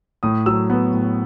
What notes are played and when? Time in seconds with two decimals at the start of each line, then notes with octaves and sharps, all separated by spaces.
0.23 A2 D#6
0.46 F#3 E6
0.70 B3
0.93 A2